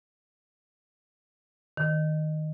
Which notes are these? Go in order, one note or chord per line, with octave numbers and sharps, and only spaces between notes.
D#3